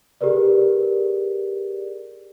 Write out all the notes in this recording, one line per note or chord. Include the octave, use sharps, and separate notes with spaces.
G4 G#4 A#4 B4 D5